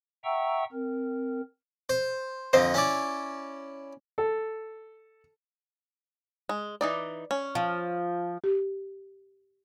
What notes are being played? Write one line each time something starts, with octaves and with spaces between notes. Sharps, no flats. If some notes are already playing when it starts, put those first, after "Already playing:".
E5 F#5 G5 A#5 C#6 E6
C4 A#4
C5
F2 D3 C5 D#5
C#4 E4 D5
A4
G#3
E3 D#4 D5
C#4
F3
G4